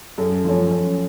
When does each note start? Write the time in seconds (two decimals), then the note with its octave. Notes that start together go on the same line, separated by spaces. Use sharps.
0.18 F#2 A4
0.44 F3 A3 C#4
0.71 F#2